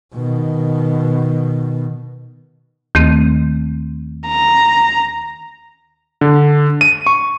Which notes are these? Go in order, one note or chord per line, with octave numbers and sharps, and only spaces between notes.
B2 D#3
D#2 D#3 A3 C4
A#5
D3
D#7
C#6